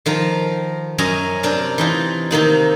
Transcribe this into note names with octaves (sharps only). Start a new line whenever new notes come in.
D#3 F3 A#4
F#2 C#4 A#4 D#5 G#5 A#5
C3 D4 A#4
E3 D#4 F4
C3 D#3 A#3 D#4